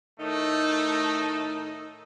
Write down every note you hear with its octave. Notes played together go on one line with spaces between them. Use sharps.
A2 D#3 A3 D#4